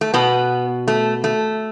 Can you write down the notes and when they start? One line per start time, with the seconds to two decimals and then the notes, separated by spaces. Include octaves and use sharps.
0.01 A3
0.14 B2 B3
0.88 A3
1.24 A3